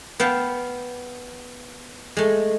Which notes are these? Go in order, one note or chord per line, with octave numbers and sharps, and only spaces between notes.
B3 F5 G5 A5
G#3 A3